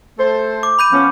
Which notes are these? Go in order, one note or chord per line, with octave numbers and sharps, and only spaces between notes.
A3 A4 C5
D6
B5 G6 D#7
F3 B3 C#4